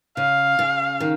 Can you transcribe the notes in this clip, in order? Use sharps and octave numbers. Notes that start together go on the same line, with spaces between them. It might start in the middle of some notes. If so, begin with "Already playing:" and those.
C#3 F5
C#3
D#3